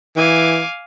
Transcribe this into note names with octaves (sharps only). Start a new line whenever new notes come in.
E3 F5 G#5 D6